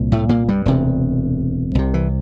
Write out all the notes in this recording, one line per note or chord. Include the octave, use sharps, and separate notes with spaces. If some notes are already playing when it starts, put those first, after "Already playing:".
Already playing: C2 A#2
A2 A3
A#2 A#3
G2 G3
E1 D2 C3
C2 C3
E3